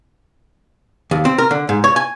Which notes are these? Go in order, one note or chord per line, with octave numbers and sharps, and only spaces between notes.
D#2
C4
A#4
D3
G#2
C#5
G#5